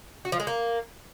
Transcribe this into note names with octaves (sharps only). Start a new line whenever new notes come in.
F#4
F3
G#3
A#3